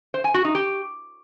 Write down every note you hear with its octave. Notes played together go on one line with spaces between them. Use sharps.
C5
G#5
F#4
D#4
G4